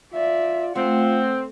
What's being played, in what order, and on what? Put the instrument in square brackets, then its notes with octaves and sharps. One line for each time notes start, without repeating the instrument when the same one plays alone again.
[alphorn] F4 [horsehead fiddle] D5 E5
[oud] A3 [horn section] C4 [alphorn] F4 [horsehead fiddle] F#5